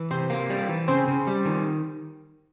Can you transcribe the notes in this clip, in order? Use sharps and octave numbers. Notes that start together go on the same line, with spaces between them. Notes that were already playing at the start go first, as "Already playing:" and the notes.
Already playing: E3
C3 C4 C5
A#3
G3
E3
C#3 C4 C5
C#3
G3
D#3